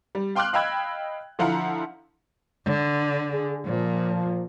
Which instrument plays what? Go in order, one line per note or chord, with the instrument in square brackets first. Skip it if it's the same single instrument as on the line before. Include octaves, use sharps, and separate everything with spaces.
[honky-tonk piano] G3
F5 G5 C6 D6 F6 F#6
D#5 F5 G5 B5 E6 G#6
D3 F3 E4 F5 F#5 A#5
[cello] D3
[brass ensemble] G#4
[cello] A#2 [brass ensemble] F3